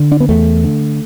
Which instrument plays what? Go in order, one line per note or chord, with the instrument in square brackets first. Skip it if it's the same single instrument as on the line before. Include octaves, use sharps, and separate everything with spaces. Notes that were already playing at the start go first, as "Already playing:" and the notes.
Already playing: [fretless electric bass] D3
D4
B3
E2 A3
D3